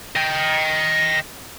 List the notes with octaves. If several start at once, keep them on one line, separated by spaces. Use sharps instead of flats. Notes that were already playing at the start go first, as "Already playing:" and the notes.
D#5 G5